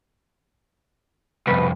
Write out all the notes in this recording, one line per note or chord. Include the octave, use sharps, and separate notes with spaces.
C2 F2 B2 B4